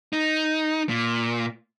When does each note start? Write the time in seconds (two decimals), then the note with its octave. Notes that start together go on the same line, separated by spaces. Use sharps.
0.13 D#4
0.89 A#2